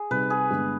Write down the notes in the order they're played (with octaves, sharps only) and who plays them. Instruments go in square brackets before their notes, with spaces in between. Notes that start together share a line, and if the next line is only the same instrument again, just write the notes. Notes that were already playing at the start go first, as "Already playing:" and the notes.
Already playing: [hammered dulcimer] G#4
[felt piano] C3 G3 C4 D#4 [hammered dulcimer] B4
[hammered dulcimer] G#4
[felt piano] G2 D3 G#3 B3